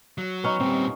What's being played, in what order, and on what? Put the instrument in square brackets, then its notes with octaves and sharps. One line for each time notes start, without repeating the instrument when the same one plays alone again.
[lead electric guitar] F#3
[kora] B3 C#4 D#4
[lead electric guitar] A#2 G3 [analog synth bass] C4